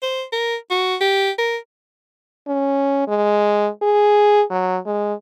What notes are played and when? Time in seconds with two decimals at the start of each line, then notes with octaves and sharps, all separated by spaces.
0.02 C5
0.32 A#4
0.71 F#4
1.01 G4
1.38 A#4
2.48 C#4
3.08 G#3
3.82 G#4
4.50 F#3
4.86 G#3